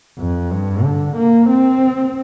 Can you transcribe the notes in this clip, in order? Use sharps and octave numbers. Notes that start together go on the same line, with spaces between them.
F2
G2
D3
A#3
C4